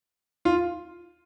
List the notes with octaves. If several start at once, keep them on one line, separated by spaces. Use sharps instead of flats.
F4